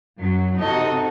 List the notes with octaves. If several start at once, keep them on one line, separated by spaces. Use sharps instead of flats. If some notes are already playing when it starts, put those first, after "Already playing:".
F#2 F#3
C3 D#4 F#4 A4 D#5